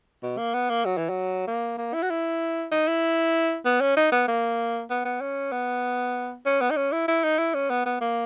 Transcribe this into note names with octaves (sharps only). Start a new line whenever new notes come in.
B2
A#3
B3
A#3
F#3
E3
F#3
A#3
A#3
E4
F#4
E4
D#4
E4
B3
C#4
D#4
B3
A#3
B3
B3
C#4
B3
C#4
B3
D#4
C#4
E4
E4
D#4
E4
C#4
B3
B3
A#3